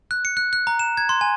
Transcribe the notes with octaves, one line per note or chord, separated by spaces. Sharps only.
F#6
C#7
F#6
F#6
A#5
E7
G#6
C6
G#5